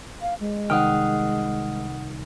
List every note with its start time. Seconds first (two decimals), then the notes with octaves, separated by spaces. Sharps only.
0.21 F5
0.40 G#3
0.70 C2 D#3 F#5 G5 D#6 F6